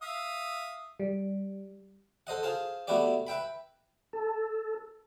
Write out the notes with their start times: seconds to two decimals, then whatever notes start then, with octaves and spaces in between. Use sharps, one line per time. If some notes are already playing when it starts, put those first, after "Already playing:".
0.02 E5 F5 D#6
1.00 G3
2.27 A4 C5 D#5 F#5
2.43 F4 G#4 C5 A5
2.87 A3 B3 E4 F#4 G4 D5
3.27 B4 E5 G5 B5
4.13 A4